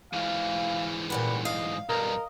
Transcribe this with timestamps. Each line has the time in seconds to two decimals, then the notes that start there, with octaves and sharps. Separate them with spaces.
0.13 G#2 E3 F5
1.10 A#2 G3 B4 F#5
1.45 D#5 F5
1.89 B1 G2 A#4 D#5